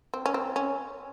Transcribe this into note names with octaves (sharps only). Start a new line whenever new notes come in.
C4
C#4
C4
C#4